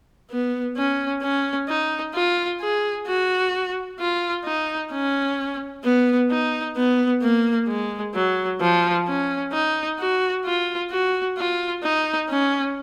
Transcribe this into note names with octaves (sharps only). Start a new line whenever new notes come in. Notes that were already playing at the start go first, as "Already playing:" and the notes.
B3
C#4
C#4
D#4
F4
G#4
F#4
F4
D#4
C#4
B3
D#4
B3
A#3
G#3
F#3
F3
C#4
D#4
F#4
F4
F#4
F4
D#4
C#4